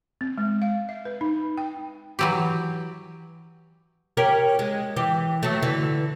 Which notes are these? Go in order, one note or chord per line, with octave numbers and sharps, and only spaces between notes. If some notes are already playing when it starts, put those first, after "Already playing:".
C4
G#3
F5
E5
B4
D#4
G5
E3 F#3 G4
C#4 G4 A#4
G#3
E3 G4
F#3 A3
D3 E3